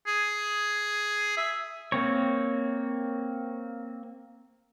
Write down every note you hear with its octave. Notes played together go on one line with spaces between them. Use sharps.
G#4
E5
A#3 C4 C#5